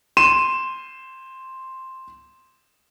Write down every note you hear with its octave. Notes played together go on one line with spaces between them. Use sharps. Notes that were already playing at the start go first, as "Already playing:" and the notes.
C6 D#7 E7